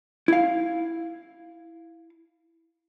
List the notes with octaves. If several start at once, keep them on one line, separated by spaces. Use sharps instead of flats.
E4 F5